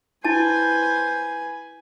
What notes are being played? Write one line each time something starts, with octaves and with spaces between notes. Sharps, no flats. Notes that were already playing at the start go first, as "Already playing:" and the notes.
E4 B4 C5 G#5 A5